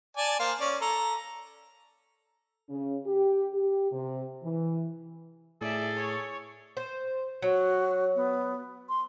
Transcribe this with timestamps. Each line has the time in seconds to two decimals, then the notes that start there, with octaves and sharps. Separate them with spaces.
0.17 D5 G#5 A5
0.39 A#3 C5 F5
0.60 C#4 D5
0.81 A4 A#5
2.70 C#3
3.05 G4
3.53 G4
3.92 C3
4.43 E3
5.61 A2 G#4 A4 D5 E5
5.97 C#5 C#6
6.77 C5
7.42 F#3 F#4
8.15 B3
8.89 C6